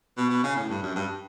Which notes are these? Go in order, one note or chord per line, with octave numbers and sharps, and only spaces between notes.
B2
B2
C#3
A2
G2
F#2
G2